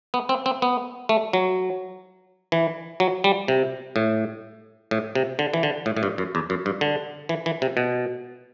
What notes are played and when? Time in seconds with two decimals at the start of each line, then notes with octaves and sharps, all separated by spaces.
0.14 B3
0.29 C4
0.46 C4
0.62 B3
1.09 A3
1.33 F#3
2.52 E3
3.00 F#3
3.24 G3
3.48 C3
3.96 A2
4.91 A2
5.15 C3
5.39 D3
5.54 E3
5.63 D3
5.86 A2
5.97 A2
6.03 G2
6.18 F#2
6.35 E2
6.50 F#2
6.66 G2
6.81 D3
7.29 E3
7.46 E3
7.62 C3
7.77 B2